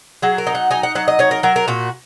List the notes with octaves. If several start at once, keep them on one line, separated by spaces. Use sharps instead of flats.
F#3 G#4
A#4
D#4
F#5
D#4 G#5
F#5
F#3 F#5
D#5
D#4 C#5
A#4
F#3 A#4
A#4
A#2 F#4